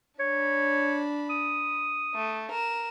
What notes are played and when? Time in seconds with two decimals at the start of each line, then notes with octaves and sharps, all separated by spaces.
0.20 D4 C#5 B5
1.30 D#6
2.15 A3
2.51 A#4 E7